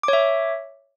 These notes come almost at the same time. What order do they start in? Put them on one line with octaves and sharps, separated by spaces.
D6 C#5 E5